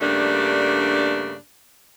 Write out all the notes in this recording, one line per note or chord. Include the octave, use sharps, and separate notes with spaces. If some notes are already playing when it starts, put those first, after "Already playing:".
G2 C#3 G3 A3 A#3 D4